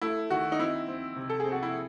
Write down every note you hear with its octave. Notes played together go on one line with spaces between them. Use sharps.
A3 E4
D#3 F#4
D#4
C4 E4
C4
C3
A4
G#4
C4
F#4
E4